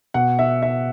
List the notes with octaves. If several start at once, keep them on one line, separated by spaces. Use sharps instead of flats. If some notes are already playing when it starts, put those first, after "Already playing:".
B2 F#5
E5
E5